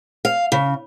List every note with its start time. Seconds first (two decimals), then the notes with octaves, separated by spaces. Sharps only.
0.25 F5
0.52 C#3